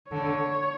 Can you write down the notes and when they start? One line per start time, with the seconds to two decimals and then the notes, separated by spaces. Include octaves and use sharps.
0.11 D3 C#5